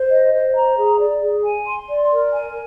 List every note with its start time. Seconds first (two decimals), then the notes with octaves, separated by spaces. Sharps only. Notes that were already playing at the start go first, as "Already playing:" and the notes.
Already playing: C5
0.10 D#5
0.32 C5
0.54 A#5
0.77 G#4
0.99 D5
1.21 G#4
1.44 G#5
1.66 C6
1.88 D5
2.11 A#4
2.33 G#5